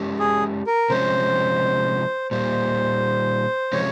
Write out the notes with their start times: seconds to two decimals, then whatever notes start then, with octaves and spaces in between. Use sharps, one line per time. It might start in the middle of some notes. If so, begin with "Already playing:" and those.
Already playing: G#3 C#4 G4 A#4
0.19 G#4
0.67 A#4
0.90 C3 F3 G#3 C#4 C5
2.31 A#2 G3 A#3 C5
3.73 C3 F3 G#3 C#4 C#5